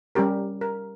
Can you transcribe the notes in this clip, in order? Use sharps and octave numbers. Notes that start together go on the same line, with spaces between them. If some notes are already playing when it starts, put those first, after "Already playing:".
G3 C#4 G4 A#4
A#4